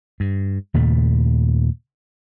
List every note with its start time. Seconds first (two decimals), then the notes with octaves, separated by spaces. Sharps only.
0.20 G2
0.74 D#2 A#2 C#3 A3